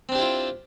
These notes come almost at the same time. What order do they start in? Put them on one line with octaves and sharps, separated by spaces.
C4 D4 G4 E4 F4